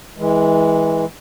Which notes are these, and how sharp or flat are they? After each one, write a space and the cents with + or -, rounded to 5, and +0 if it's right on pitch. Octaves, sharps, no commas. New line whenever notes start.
E3 -20 G#3 +0